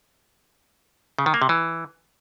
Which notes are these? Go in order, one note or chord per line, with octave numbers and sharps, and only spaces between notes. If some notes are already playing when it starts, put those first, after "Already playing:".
C#3
D#3
A#3
C3
E3